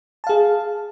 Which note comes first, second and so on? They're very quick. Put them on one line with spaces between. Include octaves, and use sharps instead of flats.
A5 F5 G#4